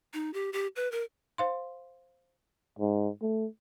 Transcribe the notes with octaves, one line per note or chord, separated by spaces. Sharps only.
D#4
G4
G4
B4
A#4
C5 F5 C6
G#2
A3